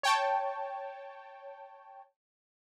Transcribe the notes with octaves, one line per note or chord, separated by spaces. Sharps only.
C#5 G5 A5